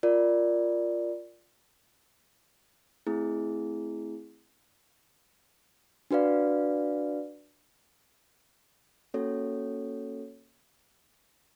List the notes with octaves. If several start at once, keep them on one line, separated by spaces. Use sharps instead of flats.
F4 A#4 D5
A3 C4 E4 G#4
D4 F#4 B4 D5 F5
A#3 C#4 F#4 A4 C#5